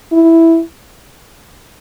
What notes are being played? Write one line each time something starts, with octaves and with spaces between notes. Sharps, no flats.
E4